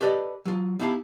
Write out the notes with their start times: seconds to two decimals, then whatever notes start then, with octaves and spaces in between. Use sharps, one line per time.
0.01 G4 A4 B4 D5 D#5
0.45 F#3 F4
0.79 B3 D#4 E4 G4 F5 A5